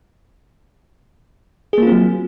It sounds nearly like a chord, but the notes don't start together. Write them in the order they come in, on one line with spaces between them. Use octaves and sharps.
G#4 A#3 F4 C4 F#3